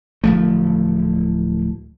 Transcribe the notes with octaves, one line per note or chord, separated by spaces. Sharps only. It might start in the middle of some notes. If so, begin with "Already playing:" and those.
D1 F3 A3